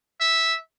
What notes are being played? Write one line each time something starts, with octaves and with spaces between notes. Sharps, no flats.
E5